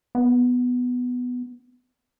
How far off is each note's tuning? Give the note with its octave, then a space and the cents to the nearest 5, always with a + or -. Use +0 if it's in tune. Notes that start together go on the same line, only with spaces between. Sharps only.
B3 +5